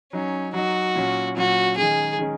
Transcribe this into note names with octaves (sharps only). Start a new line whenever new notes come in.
F#3 C#4 D#4
F#3 D#4 F#4
A#2 F#3 C#4
A#2 F#3 C#4 F#4
D#3 G#3 C#4 G#4
D#3 G#3 C#4